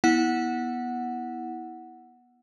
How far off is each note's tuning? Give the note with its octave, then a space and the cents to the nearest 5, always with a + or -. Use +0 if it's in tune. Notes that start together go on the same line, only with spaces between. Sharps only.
B3 -20 E4 -20 F#5 +0